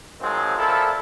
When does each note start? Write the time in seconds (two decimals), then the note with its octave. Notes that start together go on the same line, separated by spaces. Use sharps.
0.21 D#3 F3 F#3 G#3 C4
0.58 A#2 F3 E4 A4